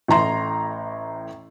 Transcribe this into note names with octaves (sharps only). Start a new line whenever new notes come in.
A1 A2 A#5 C6